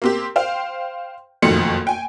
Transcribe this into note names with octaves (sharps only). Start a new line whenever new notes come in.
A#3 C4 G4
C5 F5 G5
F#1 F2 B2 D#3 A3 C#7
G5 G#5